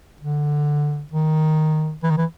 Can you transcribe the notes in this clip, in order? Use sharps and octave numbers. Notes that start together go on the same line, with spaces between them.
D3
D#3
E3
D#3
E3